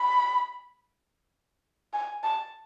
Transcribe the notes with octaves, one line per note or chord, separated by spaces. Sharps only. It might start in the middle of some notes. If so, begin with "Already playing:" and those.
Already playing: B5
G#5
A5